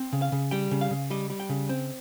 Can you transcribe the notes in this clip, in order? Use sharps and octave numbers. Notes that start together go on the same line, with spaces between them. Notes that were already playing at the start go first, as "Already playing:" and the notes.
Already playing: C4
C#3
F5
C#3
G3 G5
C#3
F5
C#3
G3 D#5
G3
G5
C#3
C4